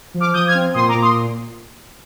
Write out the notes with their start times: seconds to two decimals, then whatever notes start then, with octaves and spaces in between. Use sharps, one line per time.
0.14 F3
0.20 D6 F6
0.34 F3 D#6 G6
0.48 F6 G#6
0.54 C4
0.74 A#2 C6 D#6
0.88 A#5 D6
0.95 A#2
1.02 C6 D#6